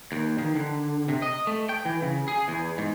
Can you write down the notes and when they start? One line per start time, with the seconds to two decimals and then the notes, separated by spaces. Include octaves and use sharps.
0.12 D#2
0.38 D#3
0.55 D3
1.08 C3
1.22 D#5
1.47 A3
1.69 G5
1.85 E3
2.02 C#3
2.28 G#4
2.48 E2
2.78 G#2